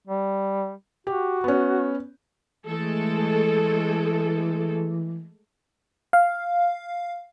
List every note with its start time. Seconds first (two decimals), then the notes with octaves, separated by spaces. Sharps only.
0.07 G3
1.07 F#4 G4
1.44 B3 C#4
2.67 E3 G#3 A3 A4
6.13 F5